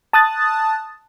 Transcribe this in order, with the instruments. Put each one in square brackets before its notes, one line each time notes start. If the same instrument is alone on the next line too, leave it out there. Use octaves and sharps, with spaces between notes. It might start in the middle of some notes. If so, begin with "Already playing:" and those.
[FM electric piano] A5 D#6 F#6 A6